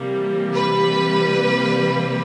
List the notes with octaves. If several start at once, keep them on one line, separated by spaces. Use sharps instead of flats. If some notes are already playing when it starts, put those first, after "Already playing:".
Already playing: C3 E3 G3 A#3
B4